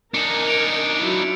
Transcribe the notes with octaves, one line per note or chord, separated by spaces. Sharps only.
D4 D#4 A#4 G#5 C#7
C#7 D7 F7
F#3 E4 F4